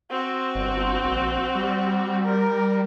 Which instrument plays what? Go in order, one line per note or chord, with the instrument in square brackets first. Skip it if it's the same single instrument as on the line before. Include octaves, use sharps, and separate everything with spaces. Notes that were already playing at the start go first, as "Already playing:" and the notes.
[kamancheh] C4 F#4
[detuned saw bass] G1
A#1
G3
[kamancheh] A#4